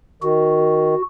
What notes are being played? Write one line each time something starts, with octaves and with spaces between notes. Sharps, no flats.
D#3 F#4